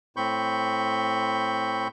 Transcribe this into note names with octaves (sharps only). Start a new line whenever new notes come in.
A2 C4 B5 C#6 G6